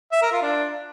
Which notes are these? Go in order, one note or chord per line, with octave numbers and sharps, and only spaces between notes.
E5
A#4
F4
D4